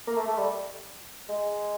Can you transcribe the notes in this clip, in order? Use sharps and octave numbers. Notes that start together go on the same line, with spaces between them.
A#3
A3
A3
G3
G#3